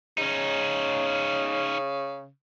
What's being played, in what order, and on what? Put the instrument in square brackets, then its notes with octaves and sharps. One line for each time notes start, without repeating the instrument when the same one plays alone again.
[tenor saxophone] C#3 [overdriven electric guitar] C#4 D#4